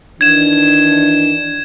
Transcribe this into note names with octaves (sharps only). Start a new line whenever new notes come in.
D#3 E3 D4 G#6 E7